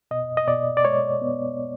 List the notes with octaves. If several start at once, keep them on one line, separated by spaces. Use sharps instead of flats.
B2 D#5
D#5
B2 D5
D5
G#3 C#5
B3